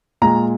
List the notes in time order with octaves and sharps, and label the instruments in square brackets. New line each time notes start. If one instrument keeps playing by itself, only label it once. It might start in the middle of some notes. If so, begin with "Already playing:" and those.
[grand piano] A#2 G#3 A#5